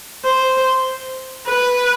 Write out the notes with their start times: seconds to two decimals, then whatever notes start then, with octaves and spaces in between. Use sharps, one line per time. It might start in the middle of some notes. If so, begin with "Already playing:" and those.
0.24 C5
1.46 B4